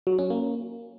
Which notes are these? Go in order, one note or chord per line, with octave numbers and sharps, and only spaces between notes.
F#3
C#4
A#3